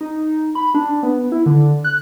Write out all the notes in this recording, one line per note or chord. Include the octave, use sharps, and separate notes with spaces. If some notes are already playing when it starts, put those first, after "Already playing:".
D#4
B5
D4
B3
E4
D3
F#6